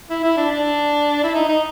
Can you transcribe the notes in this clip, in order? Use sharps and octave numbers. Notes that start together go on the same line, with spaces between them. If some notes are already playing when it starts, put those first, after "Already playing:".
E4
E4
D4
D4
E4
D#4
D#4